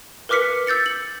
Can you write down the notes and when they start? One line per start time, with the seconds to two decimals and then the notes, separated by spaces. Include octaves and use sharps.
0.29 A#4 B4 D6 F6 B6 C#7
0.67 E6 G6 A6 C#7
0.86 F#7